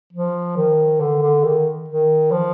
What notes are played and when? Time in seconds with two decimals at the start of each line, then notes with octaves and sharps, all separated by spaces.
0.13 F3
0.57 D#3
1.01 D3
1.23 D3
1.44 D#3
1.88 D#3
2.31 F3